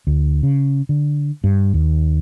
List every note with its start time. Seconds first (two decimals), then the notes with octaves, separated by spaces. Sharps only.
0.07 D2
0.43 C#3
0.89 D3
1.44 G2
1.74 D#2